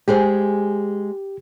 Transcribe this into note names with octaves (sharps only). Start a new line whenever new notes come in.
G#3 G4 G#4 C5